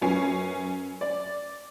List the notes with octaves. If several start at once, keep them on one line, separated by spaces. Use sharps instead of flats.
F#2 F#3 C#4 B4 G#5 C7
D5